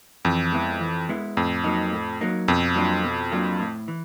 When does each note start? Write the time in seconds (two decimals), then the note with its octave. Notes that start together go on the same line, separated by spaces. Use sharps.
0.25 F2 E3
0.52 G#3 B3 E4
0.80 E3
1.09 G#3 B3 E4
1.37 F2 A2
1.64 F#3 A#3 D#4
1.92 A2
2.21 F#3 A#3 D#4
2.48 F2 B2
2.76 F#3 A#3 D4 F4
3.04 B2
3.32 F#3 A#3 D4 F4
3.59 A2
3.88 E3